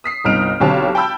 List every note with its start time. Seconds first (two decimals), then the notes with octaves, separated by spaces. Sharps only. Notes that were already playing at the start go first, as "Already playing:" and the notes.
0.04 D#6 B6 C7
0.24 G1 C2 D#4 F6 D7 F7
0.60 B1 D3 C4 G4 C#5 A5
0.95 G5 A5 B5 E6 G6